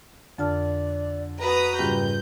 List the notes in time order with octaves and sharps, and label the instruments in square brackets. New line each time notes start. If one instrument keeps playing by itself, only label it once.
[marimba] F2 A5 F6 [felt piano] D3 [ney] D5
[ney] F#4 [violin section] B4 A#5 D#6
[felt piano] F#1 G4 [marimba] G#2 G3 F4 [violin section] G6